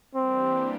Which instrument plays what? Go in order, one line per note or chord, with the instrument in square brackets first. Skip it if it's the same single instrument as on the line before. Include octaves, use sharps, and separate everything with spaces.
[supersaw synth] E3 G3 A#3 D4 G4 [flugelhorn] C4